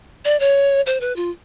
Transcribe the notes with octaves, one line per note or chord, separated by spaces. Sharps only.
D5
C#5
C5
B4
F4